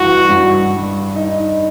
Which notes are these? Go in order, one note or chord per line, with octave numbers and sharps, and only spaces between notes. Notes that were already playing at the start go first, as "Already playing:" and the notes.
Already playing: G2 E3 F#4
G2
G3
D#4